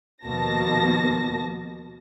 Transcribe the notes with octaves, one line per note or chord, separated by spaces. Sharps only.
D#2 B2 F3 A#3 A5 A#6